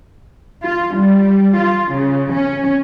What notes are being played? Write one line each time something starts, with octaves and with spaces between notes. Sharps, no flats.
F4
G3
F4
C#3
C#4